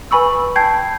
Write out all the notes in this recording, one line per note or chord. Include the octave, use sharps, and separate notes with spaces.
B4 G#5 B5 C#6 E6
G5 A5 G6 G#6 C7